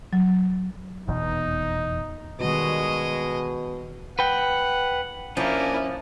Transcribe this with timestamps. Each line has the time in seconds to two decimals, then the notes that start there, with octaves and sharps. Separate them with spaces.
0.13 F#3
1.08 F1 E2 B2 D#4
2.41 B2 D#3 G3 G#3 F#4 D#5
4.19 B4 F#5 G5
5.37 F3 A#3 C#4 D4 E4 A#4 G#5